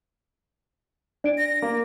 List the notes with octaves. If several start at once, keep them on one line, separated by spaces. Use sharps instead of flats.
D4 D5 D7
A#6
A#3